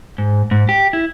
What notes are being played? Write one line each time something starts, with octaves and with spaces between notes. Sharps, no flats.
G#2
G#2
G4
E4